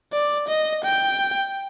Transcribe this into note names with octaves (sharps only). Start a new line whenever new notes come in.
D5
D#5
G5